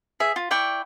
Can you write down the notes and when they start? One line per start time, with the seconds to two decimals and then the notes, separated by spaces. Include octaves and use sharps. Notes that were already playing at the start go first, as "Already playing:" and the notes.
0.20 G#4 E5
0.36 F4
0.51 E4 D5 G5 C#6